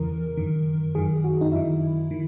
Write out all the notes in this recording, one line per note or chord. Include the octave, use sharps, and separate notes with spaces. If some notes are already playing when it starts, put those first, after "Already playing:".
Already playing: E2 C#3 E3 A#4
F#2 D#3
F#2 D#3 G#4
F#4
D#4
F#2 D#3 E4
D#3